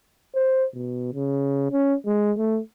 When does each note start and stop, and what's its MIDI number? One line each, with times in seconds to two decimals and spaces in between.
0.35 0.65 72
0.74 1.12 47
1.13 1.71 49
1.71 1.94 61
2.06 2.32 56
2.37 2.59 57